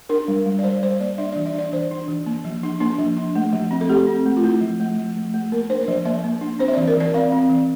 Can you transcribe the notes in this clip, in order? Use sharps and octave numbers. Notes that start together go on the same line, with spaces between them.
D4 A#4
G3
G3
D5
G3 C5
G3 C5
A#3 D5
D4 E5
D5
E3
E5
D4 D5
E3 C5
D4
E3
A#3
F3
D4
A#3 D4
F3
D4
A3
F3
C4
A4
A3 G4
C4
A3
F4
A3 E4
F3
A3
F3
A3
A3
A#3 A#4
D4 C5
C5
F3 D5
A#3 E5
A#3
D4
C4 C5
E5
D5
E3
A#4
E3 D5
C4 F5
C4
E3